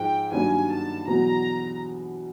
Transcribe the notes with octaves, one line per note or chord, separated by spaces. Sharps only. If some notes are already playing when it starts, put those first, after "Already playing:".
Already playing: G#2 F3 G#3 G5
G2 D#3 F#3 A#3 C#4 G#5
A5
E2 B2 F#3 A#5